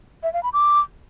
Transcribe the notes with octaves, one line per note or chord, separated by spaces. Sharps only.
E5
F5
B5
D6